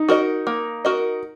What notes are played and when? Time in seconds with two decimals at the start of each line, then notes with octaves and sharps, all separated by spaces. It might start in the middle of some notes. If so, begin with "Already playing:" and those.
Already playing: D#4
0.08 F#4 A#4 D#5
0.47 A#3
0.85 F#4 A#4 D#5